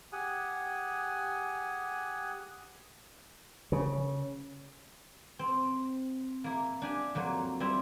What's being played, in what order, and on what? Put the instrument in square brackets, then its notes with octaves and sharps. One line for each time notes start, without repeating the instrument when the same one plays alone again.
[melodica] G4 G#4 F#5 G#5
[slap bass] C#3
[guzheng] C4
A#3 E4
D4 G4 G#5
F2 F#3 A#3
G3 C4 E4 E5